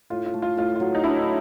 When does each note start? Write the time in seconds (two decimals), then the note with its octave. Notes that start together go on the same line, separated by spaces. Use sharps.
0.10 A2 F4
0.26 F4
0.34 A3
0.42 F4
0.57 A2 F4
0.76 F#3 F4
0.95 D#4
1.04 D4 E4